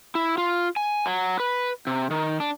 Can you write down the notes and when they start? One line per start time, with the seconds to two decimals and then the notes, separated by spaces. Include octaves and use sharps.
0.15 E4
0.38 F4
0.76 G#5
1.06 F#3
1.40 B4
1.87 C3
2.11 D#3
2.40 D4